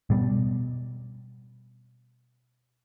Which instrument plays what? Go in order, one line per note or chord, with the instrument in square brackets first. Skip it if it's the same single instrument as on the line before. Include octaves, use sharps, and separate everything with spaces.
[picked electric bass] B2 G3